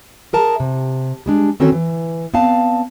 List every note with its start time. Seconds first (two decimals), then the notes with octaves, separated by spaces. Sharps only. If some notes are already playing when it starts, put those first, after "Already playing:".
0.33 G#4 A#4 A5 A#5
0.60 C3
1.26 G3 G#3 D4
1.60 D#3 C4 C#4 F#4 A4 C#5
1.72 E3
2.34 B3 C4 D5 F5 A5